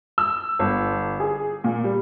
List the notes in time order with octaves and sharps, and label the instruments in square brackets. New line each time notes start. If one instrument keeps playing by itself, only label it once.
[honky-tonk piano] E6
G1
G#4
A#2
G3